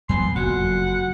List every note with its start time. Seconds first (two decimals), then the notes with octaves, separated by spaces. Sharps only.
0.09 E2 F#3 B3 G#5 B5 C6
0.36 F#1 F2 F#4 F#5